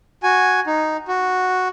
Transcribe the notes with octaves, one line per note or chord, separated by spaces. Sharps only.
F#4 G#5
D#4
F#4